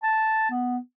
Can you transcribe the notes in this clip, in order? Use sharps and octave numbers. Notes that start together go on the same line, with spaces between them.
A5
B3